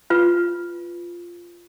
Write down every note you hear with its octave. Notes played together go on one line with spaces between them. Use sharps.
F4 B4